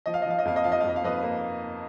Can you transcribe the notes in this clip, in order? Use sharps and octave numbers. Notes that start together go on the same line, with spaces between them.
F3 D#5
F5
D#5
F3 F5
D#5
F2 F5
D#5
F3 F5
D#5
F2 F5
D#5
F5
F2 B4 D#5
A#3